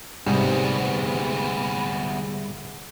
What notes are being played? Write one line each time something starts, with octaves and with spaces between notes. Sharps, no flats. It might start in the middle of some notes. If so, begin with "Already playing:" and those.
D2 G#2 C3 G3 B3 G#4